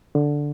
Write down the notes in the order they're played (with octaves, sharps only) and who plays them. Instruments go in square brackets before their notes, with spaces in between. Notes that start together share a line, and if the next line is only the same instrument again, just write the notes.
[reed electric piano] D3